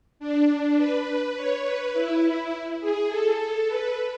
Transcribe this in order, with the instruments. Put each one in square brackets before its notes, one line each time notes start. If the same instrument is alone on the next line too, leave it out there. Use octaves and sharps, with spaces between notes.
[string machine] D4
B4
C#5
B4
E4
G#4
A4
B4